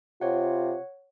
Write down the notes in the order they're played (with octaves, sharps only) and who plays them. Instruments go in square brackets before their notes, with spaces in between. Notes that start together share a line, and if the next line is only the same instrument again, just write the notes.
[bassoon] C3 [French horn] F4 [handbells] C#5 F#5